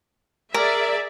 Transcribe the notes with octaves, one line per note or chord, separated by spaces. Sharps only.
G#4 A#4 D5 E5